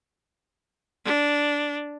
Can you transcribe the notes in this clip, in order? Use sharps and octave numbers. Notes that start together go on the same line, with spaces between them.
D4